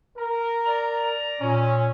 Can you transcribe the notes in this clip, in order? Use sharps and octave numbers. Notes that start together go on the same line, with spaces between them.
A#4
D5 A#5
A#2 C#4